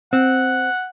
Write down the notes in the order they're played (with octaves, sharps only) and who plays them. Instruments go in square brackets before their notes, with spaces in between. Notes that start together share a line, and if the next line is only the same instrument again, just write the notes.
[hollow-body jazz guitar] C4 [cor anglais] F#5